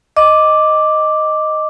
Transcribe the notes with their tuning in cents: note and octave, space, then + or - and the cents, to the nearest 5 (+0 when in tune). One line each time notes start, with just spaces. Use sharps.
D#5 +0 D6 +0